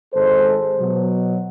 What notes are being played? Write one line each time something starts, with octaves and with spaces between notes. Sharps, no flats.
G#1 G#3 A4 C5
B2 F#3